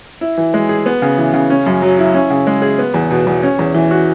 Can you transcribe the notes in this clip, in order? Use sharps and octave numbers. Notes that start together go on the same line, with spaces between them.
E4
E3
G#3
G#4
B3
C#3
E3
C#3
C#4
F#2
F#3
E4
C#4
C#3
G#3
G#4
B3
E2
B2
E2
C#4
E2
E3
F#4